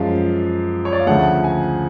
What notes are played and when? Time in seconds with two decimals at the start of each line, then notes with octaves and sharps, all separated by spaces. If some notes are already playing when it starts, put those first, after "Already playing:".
Already playing: F#2 F3 G#3 F5
0.85 C#5
0.93 D5
1.00 F5
1.06 D2 C#3 F3 A3 F#5
1.44 G#5